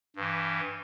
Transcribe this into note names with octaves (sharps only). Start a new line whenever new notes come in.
G2 E3